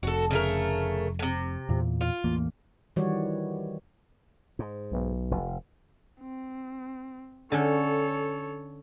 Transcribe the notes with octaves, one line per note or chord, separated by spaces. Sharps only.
F1 F#4 A4
C#3 A3 A#4
A2 C3
E2 A#2
F4
A1 E2 A#3
D#3 E3 G3 F#4 C#5 D5
G#2
B1
F1
C4
D3 C#4 A4 C#5